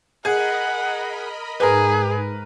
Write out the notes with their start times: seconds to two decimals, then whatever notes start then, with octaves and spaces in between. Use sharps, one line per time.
0.25 G#4 A#4 D#5 F#5 B5
1.60 G#2 G#4 A#4 B4